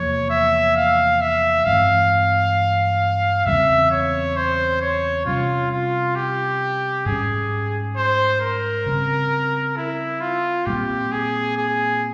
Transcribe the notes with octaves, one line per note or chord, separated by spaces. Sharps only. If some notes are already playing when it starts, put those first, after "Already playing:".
Already playing: E2 C3 F3 A#3 C#5
E5
F5
E5
G2 E3 G#3 C4 F5
E2 C#3 G3 C4 E5
C#5
C5
C#5
C3 G3 C#4 F4
F4
G4
G#2 G3 C#4 G#4
C5
A#4
C#3 G3 C4
E4
F4
A#2 G3 C4 G4
G#4
G#4